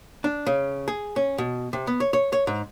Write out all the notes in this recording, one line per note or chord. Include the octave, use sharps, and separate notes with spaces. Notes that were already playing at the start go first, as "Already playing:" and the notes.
D4
C#3
G#4
C#4
B2
C3
B3
C#5
C#5
C#5
G#2